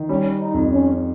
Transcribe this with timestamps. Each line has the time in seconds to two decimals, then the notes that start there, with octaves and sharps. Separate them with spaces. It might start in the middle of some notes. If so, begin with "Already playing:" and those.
Already playing: D#3
0.09 G3 C#4
0.39 D#4
0.54 F2
0.71 C#4